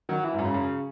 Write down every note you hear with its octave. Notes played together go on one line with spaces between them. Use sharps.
D#3 F#3
E3
G#2
F#2
C#3
F#2